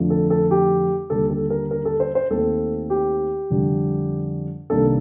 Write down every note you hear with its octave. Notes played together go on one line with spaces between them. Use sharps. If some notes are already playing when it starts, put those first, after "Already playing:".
Already playing: F2 D3 F3 A3 D4
A4
A4
G4
D#2 D3 G3 A4
A4
A#4
A#4
A4
C5
C5
D#2 D#3 A3 C4 A4
G4
F2 D3 G3
C2 C3 D#3 A#3 D4 A4